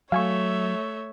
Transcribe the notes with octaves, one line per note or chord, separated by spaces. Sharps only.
F#3 A3 C#5 E5 F5 G#5 C#6